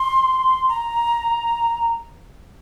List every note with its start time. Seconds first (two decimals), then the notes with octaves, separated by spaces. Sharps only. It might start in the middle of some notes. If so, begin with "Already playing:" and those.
Already playing: C6
0.69 A#5